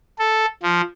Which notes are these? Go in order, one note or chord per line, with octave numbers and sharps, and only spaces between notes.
A4
F3